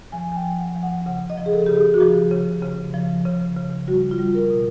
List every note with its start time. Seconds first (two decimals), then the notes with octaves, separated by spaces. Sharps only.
0.12 F3 G#5
0.32 G#5
0.36 G5
0.44 F3
0.59 F#5
0.75 F3
0.83 F#5
1.06 C#3 F#5
1.30 D#5
1.37 F3
1.46 G#4
1.53 A4
1.66 C#3 G4
1.77 G#4
1.94 F#4
2.00 F3 G4
2.31 C#3
2.62 C#3
2.94 F3
3.25 C#3
3.56 C#3
3.88 G3 F#4
4.11 F4
4.19 G3
4.35 A#4
4.50 B2